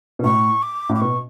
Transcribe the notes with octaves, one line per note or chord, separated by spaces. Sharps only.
B2
A2 C#6
D6
A2
D6
B2 C#6